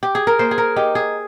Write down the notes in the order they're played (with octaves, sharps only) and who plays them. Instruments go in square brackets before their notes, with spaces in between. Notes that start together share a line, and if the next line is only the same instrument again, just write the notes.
[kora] G4
G#4
A#4
A#3 C5
G#4
A#4
D#4 G4
G#4